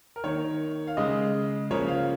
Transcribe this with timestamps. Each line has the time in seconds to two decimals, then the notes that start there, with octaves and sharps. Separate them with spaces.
0.16 A#4
0.24 D#3 A#3 C#5
0.87 F5
0.97 C#3 G#3 D#5
1.71 C#3 F3 A#3 C#5
1.88 F5